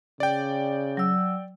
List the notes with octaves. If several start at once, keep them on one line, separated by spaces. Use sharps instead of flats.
C#3 D5 G5
F#3 E6